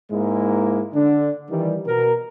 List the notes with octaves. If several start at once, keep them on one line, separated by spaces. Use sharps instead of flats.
G#2 G#3 A#3 E4
D3 D4
D#3 E3 G3
B2 A#4